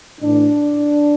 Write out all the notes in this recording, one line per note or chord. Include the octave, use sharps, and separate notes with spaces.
A2 E3 D4